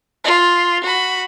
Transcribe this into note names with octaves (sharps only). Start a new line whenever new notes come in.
F4
F#4 B5